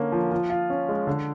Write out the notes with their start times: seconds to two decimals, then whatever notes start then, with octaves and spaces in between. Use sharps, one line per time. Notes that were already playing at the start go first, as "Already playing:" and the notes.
Already playing: D3 A#3 C#4
0.12 F3
0.31 F3
0.50 F4
0.70 C#4
0.89 G#3
1.07 D3